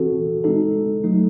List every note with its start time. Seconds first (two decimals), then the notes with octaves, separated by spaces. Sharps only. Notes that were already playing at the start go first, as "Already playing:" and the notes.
Already playing: E3 C4 F#4 A4
0.44 G#3 D#4 A4
1.04 F#3 A3 D#4